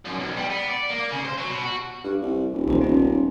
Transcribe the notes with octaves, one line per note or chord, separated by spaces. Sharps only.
F#2
B1
G3
B3
D5
A#3
C#3
C5
F#3
B2
F#4
G2
C2
D#1
D#1 B1 E3 C5
D#1 B3 C#4 F4